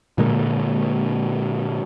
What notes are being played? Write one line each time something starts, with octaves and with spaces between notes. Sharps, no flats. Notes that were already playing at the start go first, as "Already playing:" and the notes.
A#2 D3 G#3 A#3